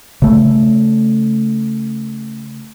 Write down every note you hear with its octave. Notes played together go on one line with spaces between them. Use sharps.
C#3 A3